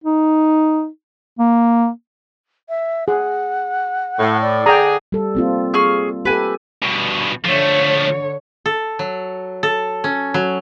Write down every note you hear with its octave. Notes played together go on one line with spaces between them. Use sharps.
D#4
A#3
E5
G#4 F#5
A2
D5
D3 D4 G#4 G5 A#5
G3 A4
A#3 C4 F4
G#4 C#6 F6
G4 A4 B4 G#5
G2 B2
D3 F3 A3 C#5
A4
F#3
A4
C#4
F#3